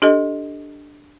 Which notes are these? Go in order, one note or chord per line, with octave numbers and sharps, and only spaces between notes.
D4 G4 A4 D#5